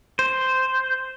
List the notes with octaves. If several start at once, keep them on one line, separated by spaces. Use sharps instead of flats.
C5